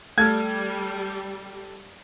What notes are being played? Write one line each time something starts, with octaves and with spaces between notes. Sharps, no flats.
G3 A3 A4 A5 F6 G#6